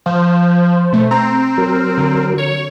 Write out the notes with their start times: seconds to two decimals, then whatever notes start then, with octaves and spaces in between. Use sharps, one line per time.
0.06 F3 C5
0.93 B2 A3
1.11 C4 A#5
1.58 F#3 A#4
1.98 D3
2.38 C#5